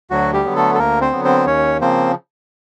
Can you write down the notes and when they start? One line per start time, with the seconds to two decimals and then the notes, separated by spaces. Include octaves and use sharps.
0.10 D2 F#3 F#4
0.33 G3 G4
0.45 D3 F#3 B3
0.56 A3 A4
0.75 A4
0.78 D2 A#3 A#4
1.01 C4 C5
1.12 D3 F#3 B3
1.25 C4 C5
1.46 D#2 C#4 C#5
1.81 C#3 F3 A#3 C4 C5